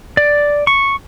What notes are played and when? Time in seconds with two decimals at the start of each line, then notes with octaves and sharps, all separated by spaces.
0.17 D5
0.67 C#6